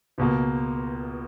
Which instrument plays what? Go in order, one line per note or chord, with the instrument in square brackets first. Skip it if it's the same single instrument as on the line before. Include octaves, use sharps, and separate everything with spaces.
[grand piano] C#2 B2 A#3